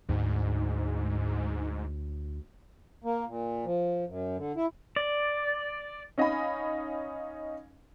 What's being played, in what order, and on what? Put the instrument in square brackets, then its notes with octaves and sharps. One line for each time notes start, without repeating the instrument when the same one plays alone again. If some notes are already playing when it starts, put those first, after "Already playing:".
[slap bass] D2 [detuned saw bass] G#2
[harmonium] A#3
A#2
F3
F#2
D3
E4
[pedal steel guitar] D5
[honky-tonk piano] C#4 D#4 D#5 F5 G#5 B5